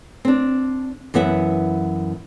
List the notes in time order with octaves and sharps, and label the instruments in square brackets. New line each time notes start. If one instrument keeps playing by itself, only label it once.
[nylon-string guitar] C4 D4
F#2 E3 B3 E5 F#5